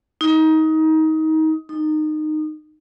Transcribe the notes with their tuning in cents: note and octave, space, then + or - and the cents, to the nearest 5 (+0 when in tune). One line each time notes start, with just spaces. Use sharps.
D#4 +25
D#4 -20